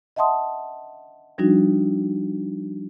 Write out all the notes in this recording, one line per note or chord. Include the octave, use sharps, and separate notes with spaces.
D#5 E5 F#5 A5 C6 D#6
F3 G3 D4 D#4 F#4